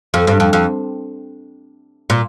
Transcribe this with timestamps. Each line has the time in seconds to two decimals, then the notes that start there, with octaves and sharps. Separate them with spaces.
0.14 F2
0.27 G2
0.40 F2
0.53 F2
2.10 A#2